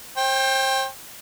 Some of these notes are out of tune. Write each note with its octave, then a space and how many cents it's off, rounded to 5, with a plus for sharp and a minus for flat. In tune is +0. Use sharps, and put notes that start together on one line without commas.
C5 +40 G5 +15